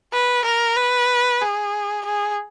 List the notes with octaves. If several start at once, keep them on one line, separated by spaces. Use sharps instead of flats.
B4
A#4
B4
G#4
G#4